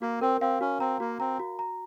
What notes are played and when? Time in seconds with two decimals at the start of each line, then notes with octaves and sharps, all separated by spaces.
0.02 A#3 F#4
0.21 C4 A#4
0.41 C4 F5
0.61 C#4 F#4
0.80 C4 A#5
1.00 A#3 F#4
1.20 C4 A#5
1.39 F#4
1.59 A#5